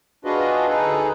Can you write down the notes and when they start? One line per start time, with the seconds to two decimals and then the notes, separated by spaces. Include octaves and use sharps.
0.25 D4 F4 F#4 G#4 B4 D#5
0.68 D2 D#4 G#4 A4 B4